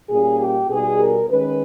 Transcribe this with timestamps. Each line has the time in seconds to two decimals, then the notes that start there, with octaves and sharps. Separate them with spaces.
0.10 A#2 G3 A#3 C#4 G#4
0.40 G4
0.69 B2 G3 B3 D#4 G#4
1.00 A#4
1.30 D#3 G#3 C#4 B4